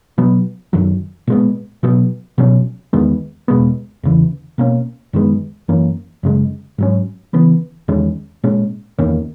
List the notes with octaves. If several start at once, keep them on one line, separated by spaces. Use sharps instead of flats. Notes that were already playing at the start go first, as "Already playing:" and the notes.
B2 F#3 B3
F#2 D#3 F#3
A#2 G#3 B3
B2 F#3 B3
B2 F#3 C#4
E2 D#3 G#3 B3
E2 B2 G#3 B3
E2 C#3 E3
B2 A#3 C#4
F#2 D#3 G#3 B3
F#2 E3 A#3 C#4
F#2 C#3 G#3
G#2 F#3 C#4
C#3 E3 B3
E2 D#3 G#3 C#4
A#2 G#3 C#4
E2 D#3 A#3 C#4